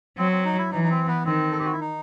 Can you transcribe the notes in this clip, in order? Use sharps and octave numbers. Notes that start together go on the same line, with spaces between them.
F#3 C4
C4
D#4
E4
E3 D#4
D#4
C4
B3
D#3 C4
A4
G4
F#4
E4
D#4